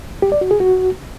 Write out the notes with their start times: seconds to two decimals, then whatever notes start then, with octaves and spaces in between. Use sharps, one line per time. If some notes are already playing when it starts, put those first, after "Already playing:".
0.22 G4
0.32 D5
0.41 F#4
0.51 G#4
0.60 F#4